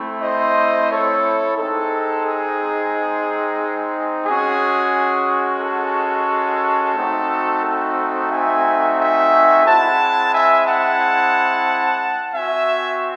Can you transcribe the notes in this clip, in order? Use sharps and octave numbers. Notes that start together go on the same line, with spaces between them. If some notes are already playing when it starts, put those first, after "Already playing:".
Already playing: A3 C4 E4
C5 D#5
A4 C#5
G#3 C4 D#4 A4
G#4
G#3 C#4 F#4 G#4
A4
A3 C4 D#4 F#4
A4
E5 G#5
E5 G#5
G#3 C4 E4 F#5 A5
E5 G#5
F#5 A5
C4 F#4 E5 G#5